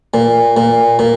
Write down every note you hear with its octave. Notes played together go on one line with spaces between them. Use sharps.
A#2
A#2
A#2